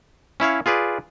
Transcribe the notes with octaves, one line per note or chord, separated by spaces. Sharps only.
C#4 E4 C#5 F5
F4 G#4 B4 D5